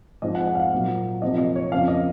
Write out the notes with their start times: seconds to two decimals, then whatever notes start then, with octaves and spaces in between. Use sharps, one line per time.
0.22 G#2 F3 G#3 C4 D#5
0.35 F#5
0.47 F#5
0.55 F5
0.60 F#5
0.72 A#2 F#3 A#3 D#4
1.21 C3 F3 A#3 D#4 D#5
1.38 D#5
1.56 C#5
1.71 F2 C#3 F3 A#3 D#4 F5
1.88 D#5